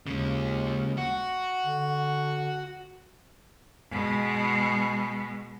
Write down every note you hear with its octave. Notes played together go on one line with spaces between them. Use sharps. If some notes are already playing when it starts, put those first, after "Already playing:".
D#2 C#3 G#3
F#4
D3
B2 G#3